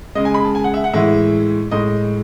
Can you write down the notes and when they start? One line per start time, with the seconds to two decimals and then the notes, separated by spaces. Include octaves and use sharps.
0.15 C#3 G#3 D#5
0.25 G#5
0.34 B5
0.45 A5
0.55 G#5
0.64 F#5
0.74 E5
0.84 F#5
0.93 A2 E3 G#3 E5
1.71 A2 G#3 D#5